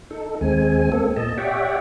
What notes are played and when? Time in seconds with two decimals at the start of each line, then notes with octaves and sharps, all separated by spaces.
0.11 D#4 A4
0.41 D#2 G#3 C4 G#5
0.92 A#3 C4 A4
1.17 A#2 D#5 A5
1.38 G4 C#5 D5 E5 F#5 G5